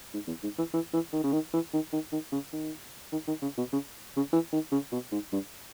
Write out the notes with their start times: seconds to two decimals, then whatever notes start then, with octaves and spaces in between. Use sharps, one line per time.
0.14 G#2
0.27 E2
0.43 G#2
0.58 E3
0.73 E3
0.93 E3
1.13 D#3
1.24 C#3
1.33 D#3
1.53 E3
1.73 D#3
1.93 D#3
2.12 D#3
2.32 C#3
2.53 D#3
3.12 D#3
3.28 D#3
3.42 C#3
3.58 B2
3.73 C#3
4.17 C#3
4.33 E3
4.53 D#3
4.72 C#3
4.92 B2
5.12 G#2
5.33 G2